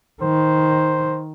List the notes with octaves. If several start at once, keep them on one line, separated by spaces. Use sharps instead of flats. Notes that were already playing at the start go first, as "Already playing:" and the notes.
D#3 C5